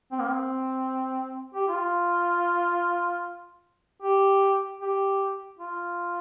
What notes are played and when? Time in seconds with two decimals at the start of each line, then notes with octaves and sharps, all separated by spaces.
0.12 C4
0.20 A#3
0.29 C4
1.54 G4
1.68 F4
4.02 G4
4.81 G4
5.59 F4